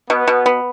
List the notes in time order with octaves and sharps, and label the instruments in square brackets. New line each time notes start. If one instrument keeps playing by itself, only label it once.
[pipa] B2 [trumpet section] B3
[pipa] B2
B3